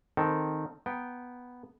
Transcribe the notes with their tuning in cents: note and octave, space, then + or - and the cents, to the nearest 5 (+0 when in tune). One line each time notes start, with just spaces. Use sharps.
D#3 -5 C4 -10 A4 +0
B3 +0 G5 +0 A#5 +0